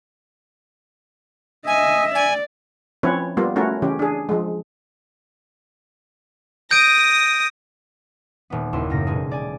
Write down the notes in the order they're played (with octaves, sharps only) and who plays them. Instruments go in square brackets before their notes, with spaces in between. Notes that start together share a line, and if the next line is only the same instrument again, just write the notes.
[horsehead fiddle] D#5 E5 [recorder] G#5
[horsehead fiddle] D5 [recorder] G#5
[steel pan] F3 C4 C#4 E4 B4 C#5
G3 A#3 B3 F4
A3 C#4 E4 F#4 A#4
C#3 E3 C#4 G4
D4 G#4
F3 G#3
[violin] D#6 A#6 [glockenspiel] G6 D7
[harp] D#1 B3
F#1 D#2 E4 C6 E6
F#2 A2 C#3 A#6
E1 G#3 G#4
D5 G#5